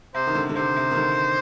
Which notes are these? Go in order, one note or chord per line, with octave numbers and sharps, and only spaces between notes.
C3 C5
D#3
D3
D3
C3 C5
C3
D#3
D3